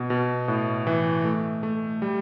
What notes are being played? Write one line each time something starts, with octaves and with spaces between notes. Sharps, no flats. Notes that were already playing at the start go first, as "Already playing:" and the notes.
Already playing: B2
B2
A2
E3
A3
A3
G3